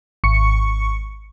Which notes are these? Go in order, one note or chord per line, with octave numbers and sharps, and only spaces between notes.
G#1 C#6 C#7